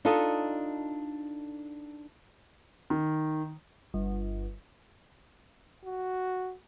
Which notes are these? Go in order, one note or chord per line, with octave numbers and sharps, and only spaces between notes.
D4 D#4 F4 A4 D#5
D#3
G1
F#4